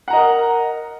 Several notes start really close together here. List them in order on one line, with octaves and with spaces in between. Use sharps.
F#5 A#5 D#5 A#4